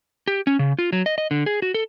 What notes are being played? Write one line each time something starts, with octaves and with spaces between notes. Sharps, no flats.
G4
C#4
C#3
F4
F#3
D#5
D#5
D3
G#4
F#4
A4